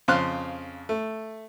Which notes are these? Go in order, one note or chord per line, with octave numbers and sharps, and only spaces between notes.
F2 C#3 C5 F5 C6 F#6
A3